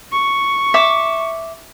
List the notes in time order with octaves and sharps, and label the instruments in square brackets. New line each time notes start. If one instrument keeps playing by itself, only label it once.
[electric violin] C#6
[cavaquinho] E5 D6